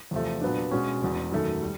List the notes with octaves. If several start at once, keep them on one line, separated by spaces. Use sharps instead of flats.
E2 C3 F3 A3
A#2 F#3 B3 D4
B2 G#3 C#4 F#4
E1 E2 B2
F#2 D#3 F#3 A3
G3